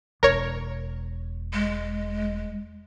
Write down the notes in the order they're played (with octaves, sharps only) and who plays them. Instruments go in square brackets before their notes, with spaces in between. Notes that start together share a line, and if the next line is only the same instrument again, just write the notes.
[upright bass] E1 [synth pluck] A#4 C#5
[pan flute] G#3